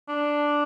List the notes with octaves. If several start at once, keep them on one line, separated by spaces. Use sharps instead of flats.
D4